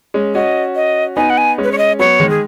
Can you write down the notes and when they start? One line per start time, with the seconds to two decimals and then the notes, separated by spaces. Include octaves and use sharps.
0.14 G#3 C#4
0.35 C#4 F#4 D#5
0.76 D#5
1.17 B3 D#4 G#5
1.30 F#5
1.38 G#5
1.58 G#3 C#4
1.64 B4
1.72 C#5
1.78 D#5
1.99 F#3 B3 C#5
2.20 D#3 G#3
2.30 G#4